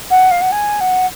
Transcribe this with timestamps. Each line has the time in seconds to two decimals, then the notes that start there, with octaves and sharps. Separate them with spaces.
0.10 F#5
0.31 F5
0.41 F#5
0.51 G#5
0.80 F#5